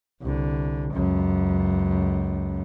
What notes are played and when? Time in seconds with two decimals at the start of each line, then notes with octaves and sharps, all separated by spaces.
0.21 C2 D3
0.93 C#2 F#2